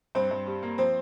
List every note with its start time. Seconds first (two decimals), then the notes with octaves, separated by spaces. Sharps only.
0.15 G2 C4 C5
0.31 G2
0.47 G3
0.63 A#3
0.78 F3 C4 C5